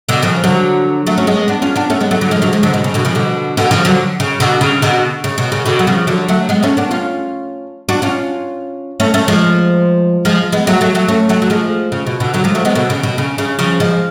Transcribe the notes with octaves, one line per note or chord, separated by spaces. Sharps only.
B2 D3
C#3 F3
D3 F#3
F#3 A3
C#4
G#3 B3
B3 D4
C#4 F4
B3 D4
A3 C#4
G#3 B3
F#3 A3
D3 F#3
F3 G#3
D3 F#3
F3 G#3
D3 F#3
B2
C#3
B2 D3
C#3 F3
B2 D3
B2 D3
C#3 F3
D3 F#3
C#3
B2 D3
C#3
B2 D3
C#3
B2
C#3
B2 D3
F#3
C#3 F3
D3 F#3
F#3 A3
G#3 B3
A3 C#4
B3 D4
C#4 F4
D4 F#4
C#4 F4
A3 C#4
A3 C#4
F3 G#3
F3 G#3
G#3 B3
F#3 A3
F#3 A3
F#3 A3
A3 C#4
F#3 A3
F#3
F3 G#3
C#3
B2
B2 D3
D3 F#3
F3 G#3
F#3 A3
G#3 B3
B2 D3
C#3
B2
C#3
C#3
C#3 F3
F3 G#3